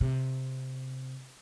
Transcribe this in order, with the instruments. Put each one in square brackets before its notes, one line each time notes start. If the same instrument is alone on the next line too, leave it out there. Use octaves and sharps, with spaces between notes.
[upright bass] C3